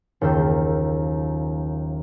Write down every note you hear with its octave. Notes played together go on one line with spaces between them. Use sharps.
F#1 D#2 F4 E6 G6